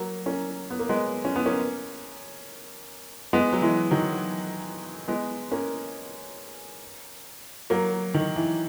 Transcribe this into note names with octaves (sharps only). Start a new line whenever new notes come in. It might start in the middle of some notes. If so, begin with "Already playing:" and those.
Already playing: F#3 A#3
A#3 C#4
B3
A#3
G#3 B3
C#4
B3
A#3 C#4
G#3 B3
F#3
E3 G#3
D#3 F#3
G#3 B3
A#3 C#4
F#3 A#3
D#3
E3